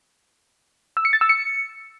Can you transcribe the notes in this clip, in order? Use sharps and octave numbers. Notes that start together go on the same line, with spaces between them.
E6
C#7
A6
E6
C#7